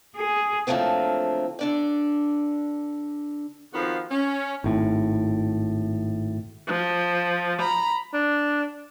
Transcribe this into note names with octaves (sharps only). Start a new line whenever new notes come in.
G#4
D3 F3 F#3 A3 A#3 C4
D3 D4 D5
F2 D#3 F3 B3 F#4 F5
C#4
G#1 A2
F3
A#5 B5
D4